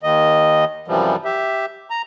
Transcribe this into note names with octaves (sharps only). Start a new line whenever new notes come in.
D#2 D#3 D#5
F#2 C3 E3 F3 G3
G4 E5
A#5